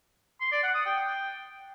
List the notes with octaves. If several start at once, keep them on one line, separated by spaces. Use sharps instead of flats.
C6
D5
F#5
D#6
G5